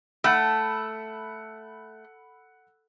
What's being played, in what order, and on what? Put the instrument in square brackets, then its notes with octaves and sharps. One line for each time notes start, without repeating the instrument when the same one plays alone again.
[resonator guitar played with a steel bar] A3 [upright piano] F#5 B5 E6